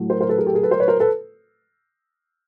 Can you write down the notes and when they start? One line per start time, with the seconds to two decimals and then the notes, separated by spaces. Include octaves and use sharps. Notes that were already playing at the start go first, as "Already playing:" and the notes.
Already playing: A2 F#3 A3
0.10 A#4 C5
0.21 A#4 C5
0.29 A4 B4
0.38 G#4 A#4
0.46 G4 A4
0.54 G#4 A#4
0.63 A4 B4
0.71 A#4 C5
0.80 B4 C#5
0.88 A#4 C5
1.00 A4 B4